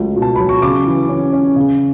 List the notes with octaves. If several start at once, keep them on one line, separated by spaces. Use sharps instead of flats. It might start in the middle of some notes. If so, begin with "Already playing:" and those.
Already playing: C#2 F#3 A3
B2
A5
F#3 B5
C#6
C#3 D6
E3
C#4
C#4
C#3